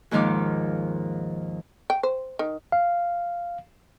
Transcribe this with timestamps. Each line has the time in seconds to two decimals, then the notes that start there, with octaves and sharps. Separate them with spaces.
0.11 D#2 G#2 D#3 F3 F5 D6
1.90 G5
2.03 C5
2.39 D#3
2.72 F5